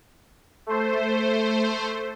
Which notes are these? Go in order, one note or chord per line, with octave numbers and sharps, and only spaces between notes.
A3 C5